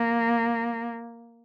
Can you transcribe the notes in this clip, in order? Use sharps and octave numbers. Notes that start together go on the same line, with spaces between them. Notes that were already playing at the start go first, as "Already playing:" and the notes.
Already playing: A#3